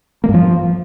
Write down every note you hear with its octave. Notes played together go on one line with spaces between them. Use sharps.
A#3
G2
F3